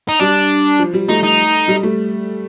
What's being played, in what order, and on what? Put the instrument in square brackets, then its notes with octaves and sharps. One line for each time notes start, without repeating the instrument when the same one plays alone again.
[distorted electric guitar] D#4
[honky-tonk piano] G3 [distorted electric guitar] D4
[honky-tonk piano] F3
G3
[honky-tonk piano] A3 [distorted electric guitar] D#4
[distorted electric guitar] D#4
[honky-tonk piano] G3
A3